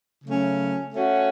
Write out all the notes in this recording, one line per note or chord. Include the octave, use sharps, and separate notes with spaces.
C#3 F#3 A3 C#4
A3 C#4 F#4